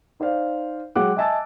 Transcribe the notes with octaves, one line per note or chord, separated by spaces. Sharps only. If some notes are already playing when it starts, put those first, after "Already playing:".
D#4 C5 D5 F5
F#3 G#3 F#5 G5 D6 F#6
D#5 E5 G#5 A5 E6 A6